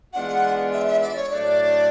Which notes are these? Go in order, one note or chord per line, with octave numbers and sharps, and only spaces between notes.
E3 G#3 B3 D4 F4 F#5
E5
E5
D5
C#5
A2 F#3 A3 D4 D5